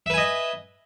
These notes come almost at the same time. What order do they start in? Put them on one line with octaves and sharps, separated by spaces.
E5 B4 G#5 D#5